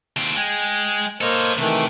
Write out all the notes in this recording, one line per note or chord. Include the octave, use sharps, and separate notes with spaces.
D#2 C4
G#3 G5 G#5
A#3 A4 C5 C#5 D#5
C3 D#3 E3 A3